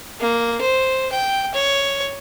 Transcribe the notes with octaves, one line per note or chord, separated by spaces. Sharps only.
A#3
C5
G5
C#5